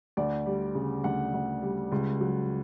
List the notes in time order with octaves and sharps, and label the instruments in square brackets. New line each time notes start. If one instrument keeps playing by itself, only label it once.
[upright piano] D2 D5
G3
C#3
D2 F#5
D2
G3
C#2
F#3